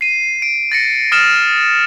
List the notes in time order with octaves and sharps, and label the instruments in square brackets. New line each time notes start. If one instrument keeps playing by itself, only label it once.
[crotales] C7 D#7
D7
A6 A#6 C#7
D#6 F6 A6 E7